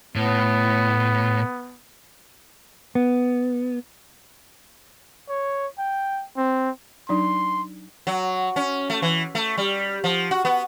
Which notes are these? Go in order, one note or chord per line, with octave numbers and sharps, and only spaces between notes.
A2 B3
B3
C#5
G5
C4
F#3 D4 D#4 C6
F#3
C#4
A3
E3
A3
G3
F3
F#4
B3